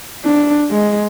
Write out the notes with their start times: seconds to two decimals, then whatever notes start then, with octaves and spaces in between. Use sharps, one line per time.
0.25 D4
0.71 G#3